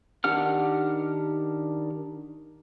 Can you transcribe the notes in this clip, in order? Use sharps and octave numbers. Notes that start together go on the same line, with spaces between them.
D#3 D4 G4 F#5 F6